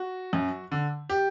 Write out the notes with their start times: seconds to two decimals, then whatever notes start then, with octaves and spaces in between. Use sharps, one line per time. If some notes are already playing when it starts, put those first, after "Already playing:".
Already playing: F#4
0.33 F#2
0.72 D3
1.10 G4